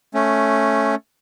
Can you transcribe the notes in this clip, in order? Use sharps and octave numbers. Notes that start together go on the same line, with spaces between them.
A3 C#4